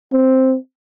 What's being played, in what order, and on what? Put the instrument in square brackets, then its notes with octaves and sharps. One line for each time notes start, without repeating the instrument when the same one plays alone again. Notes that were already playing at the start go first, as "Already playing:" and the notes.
[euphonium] C4